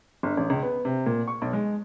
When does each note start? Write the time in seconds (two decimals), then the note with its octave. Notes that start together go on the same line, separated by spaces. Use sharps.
0.23 G1
0.37 A1
0.50 C#2
0.62 B3
0.85 C3
1.06 A#2
1.28 C#6
1.42 B1
1.53 G#3